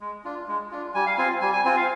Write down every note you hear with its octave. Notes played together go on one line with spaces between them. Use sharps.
G#3
D4 F4
G#3
D4 F4
G3 G#5
F5
C4 F4 G#5
G3 G#5
G#5
C4 F4 G#5
F5